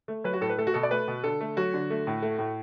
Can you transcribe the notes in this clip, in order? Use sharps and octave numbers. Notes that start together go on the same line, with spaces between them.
A3
F#3 B4
F#4
A2 A4
B4
A3 A4
F#4
B2 A4
D5
A3 B4
B2
D3 A4
A3
F#3 F#4
D3
A3
A2
A3
A2